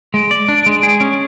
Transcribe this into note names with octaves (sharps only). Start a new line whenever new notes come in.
G#3 D7
D5
D4
G#3
G#4
C#4